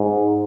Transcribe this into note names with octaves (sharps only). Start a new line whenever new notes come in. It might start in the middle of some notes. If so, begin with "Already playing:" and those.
Already playing: G#2